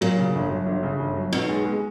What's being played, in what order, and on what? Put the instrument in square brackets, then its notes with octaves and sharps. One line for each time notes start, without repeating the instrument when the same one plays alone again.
[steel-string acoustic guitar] A#2 [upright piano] F#3
[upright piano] C#3
G1
F#3
G1
C#3
G1
F#3
[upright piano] B1 [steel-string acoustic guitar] B2
[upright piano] G#3
G#3